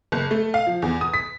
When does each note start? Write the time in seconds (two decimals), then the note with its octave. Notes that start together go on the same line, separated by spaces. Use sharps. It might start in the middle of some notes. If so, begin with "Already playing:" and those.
0.12 F#1
0.31 A3
0.54 F5
0.67 F3
0.82 E2
1.01 D#6
1.14 B6